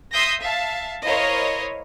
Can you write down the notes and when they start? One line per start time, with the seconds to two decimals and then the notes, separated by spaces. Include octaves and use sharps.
0.12 E5 C6 D#6 E6 G6 A#6
0.41 E5 F5 A5
1.05 E4 A#4 C5 C#5 D#5 F5